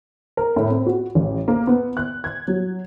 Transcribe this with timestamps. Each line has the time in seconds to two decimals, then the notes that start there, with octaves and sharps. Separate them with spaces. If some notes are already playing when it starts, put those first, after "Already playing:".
0.37 A#4
0.56 A2
0.70 C4
0.86 F#4
1.15 A1
1.48 A#3
1.67 B3
1.97 F#6
2.24 G#6
2.48 F#3